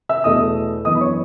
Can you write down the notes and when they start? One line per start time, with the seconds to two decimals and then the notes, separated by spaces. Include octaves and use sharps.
0.09 E5 E6
0.24 E2 B2 A3 D#5 D#6
0.85 F#2 E3 B3 D#5 D#6
0.95 B5
1.01 C#5 C#6